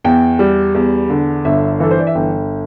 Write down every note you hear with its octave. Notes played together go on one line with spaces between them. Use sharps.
E2 G5
G3
E2
D3
G1 E5
E3 A4
C5
D5
E5
G1 G5